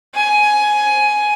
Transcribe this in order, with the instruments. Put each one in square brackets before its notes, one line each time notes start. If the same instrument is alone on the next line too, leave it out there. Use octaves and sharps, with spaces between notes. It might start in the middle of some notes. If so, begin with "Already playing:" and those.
[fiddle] G#5